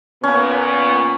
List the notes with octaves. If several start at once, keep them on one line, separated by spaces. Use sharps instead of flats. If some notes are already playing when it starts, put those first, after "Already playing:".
A#2 B3 C#4